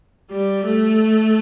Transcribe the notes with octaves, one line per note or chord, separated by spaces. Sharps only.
G3
A3